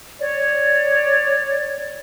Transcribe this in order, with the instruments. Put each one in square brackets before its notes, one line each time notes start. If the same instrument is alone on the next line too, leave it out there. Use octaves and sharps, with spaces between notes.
[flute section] C#5 D5